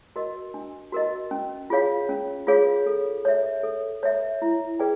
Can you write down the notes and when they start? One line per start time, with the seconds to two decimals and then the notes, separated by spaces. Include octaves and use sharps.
0.16 F#4 A#4 D#5
0.54 D4
0.92 F#4 A#4 D#5
1.31 C#4
1.70 F4 G#4 C#5 F5
2.09 C#4
2.47 F4 G#4 C#5 F5
2.86 A4
3.25 C#5 E5
3.63 A4
4.03 C#5 E5
4.42 E4
4.79 G#4 B4 D5 G5